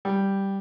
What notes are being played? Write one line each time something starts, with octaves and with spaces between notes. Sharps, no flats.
G3